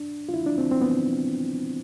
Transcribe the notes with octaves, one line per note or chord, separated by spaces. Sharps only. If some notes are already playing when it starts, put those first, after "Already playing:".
Already playing: D4
F4
E4
D4
C4
C4
B3